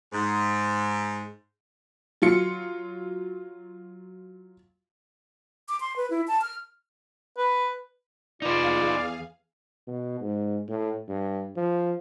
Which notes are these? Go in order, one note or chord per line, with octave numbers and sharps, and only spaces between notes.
G#2
F#3 F4 C#7
D6
C6
B4
E4
A5
F6
B4
E2 D#4 F4 G#4 B4 D5 F5
B2
G#2
A2
G2
F3